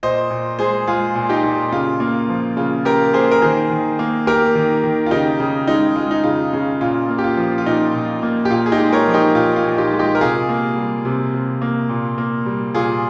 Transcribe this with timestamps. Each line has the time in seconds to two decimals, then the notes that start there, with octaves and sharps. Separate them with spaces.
0.03 A#2 C5 D#5
0.31 A#2
0.59 G#3 G#4 C5
0.87 G#3 F4 G#4
1.15 A#2
1.29 D#4 G4
1.44 A#2
1.72 C#3 F4
2.00 A#3
2.29 F3
2.57 C#3 F4
2.85 C#3 G4 A#4
3.13 A#3 G#4 C5
3.31 A#4
3.42 D#3 G#4 C5
3.70 D#3
3.99 A#3
4.27 A#3 G4 A#4
4.55 D#3
4.84 D#3
5.06 F4
5.11 C#3 D#4 G4
5.40 C#3
5.67 G#3 D#4
5.96 G#3 F4
6.11 D#4
6.24 C#3 F4
6.53 C#3
6.81 A#2 F4
7.09 A#3
7.19 G4
7.24 F4
7.37 F3
7.58 F4
7.66 A#2 D#4
7.94 A#2
8.23 A#3
8.45 G4
8.50 A#2 F4
8.66 G#4
8.72 D#4 G4
8.79 G#3
8.93 A#4 C#5
9.08 F3
9.14 D#4 G4
9.35 A#2 F4
9.56 F4
9.64 A#2
9.78 D#4 G4
9.92 G#3 F4
9.99 D#4 G4
10.15 A#4
10.20 C3 F4 G#4
10.49 A#3
10.76 G3
11.05 C3
11.34 C3
11.62 A#3
11.89 A#2
12.18 A#3
12.46 G3
12.75 A#2 F4 G#4